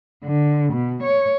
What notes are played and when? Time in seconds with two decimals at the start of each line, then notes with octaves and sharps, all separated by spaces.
0.24 D3
0.73 B2
1.03 C#5